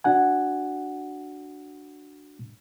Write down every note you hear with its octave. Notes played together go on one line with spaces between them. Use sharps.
D4 F#4 F#5 G#5